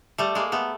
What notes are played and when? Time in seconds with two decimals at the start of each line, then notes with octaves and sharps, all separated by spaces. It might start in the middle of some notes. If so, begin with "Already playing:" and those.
0.18 G3 A3
0.35 G#3 A#3
0.52 A3 B3